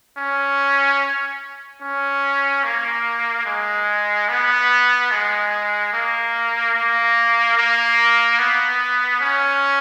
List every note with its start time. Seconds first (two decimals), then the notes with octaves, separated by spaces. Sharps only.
0.18 C#4
1.82 C#4
2.64 A#3
3.46 G#3
4.29 B3
5.11 G#3
5.93 A#3
6.75 A#3
7.58 A#3
8.39 B3
9.21 C#4